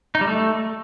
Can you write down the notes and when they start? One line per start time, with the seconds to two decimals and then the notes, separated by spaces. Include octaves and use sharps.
0.15 D#4
0.21 G3
0.27 A3